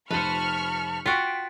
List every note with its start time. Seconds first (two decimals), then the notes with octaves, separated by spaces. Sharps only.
0.11 F1 B4 C5 A5 B5 C#6 F6 D#7
1.06 F4 F#4 G5 B6 C#7 D7